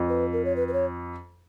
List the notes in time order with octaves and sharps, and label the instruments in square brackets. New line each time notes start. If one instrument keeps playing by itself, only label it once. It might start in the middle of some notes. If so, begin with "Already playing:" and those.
Already playing: [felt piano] F2
[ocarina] B4
A#4
C#5
B4
B4
C#5